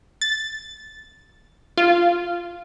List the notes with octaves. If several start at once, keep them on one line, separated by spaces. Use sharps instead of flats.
A6
F4